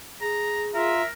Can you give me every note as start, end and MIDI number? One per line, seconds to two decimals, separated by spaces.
0.21 0.93 68
0.21 0.66 82
0.75 1.01 65
0.75 1.12 70
0.75 1.05 76
0.75 1.01 82